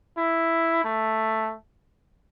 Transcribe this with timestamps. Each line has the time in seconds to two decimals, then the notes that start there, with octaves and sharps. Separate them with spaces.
0.17 E4
0.84 A3